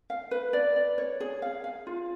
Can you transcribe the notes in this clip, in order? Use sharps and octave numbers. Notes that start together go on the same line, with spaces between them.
F5
B4
D5
D5
C#5
G#4
F5
F5
F4